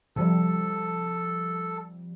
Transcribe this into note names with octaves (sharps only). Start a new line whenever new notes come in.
C3 F3 G3 A4